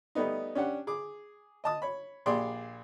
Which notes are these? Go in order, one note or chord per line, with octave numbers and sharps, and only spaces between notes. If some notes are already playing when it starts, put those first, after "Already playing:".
G3 A3 B3 D#4
C#4 D4 G4 F#5
G#4 D6
D#5 A5 D#6
C#5 B5
A#1 G4 G#4 D5 C6 D6